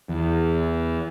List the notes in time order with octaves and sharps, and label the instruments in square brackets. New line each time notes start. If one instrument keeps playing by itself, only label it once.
[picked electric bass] E2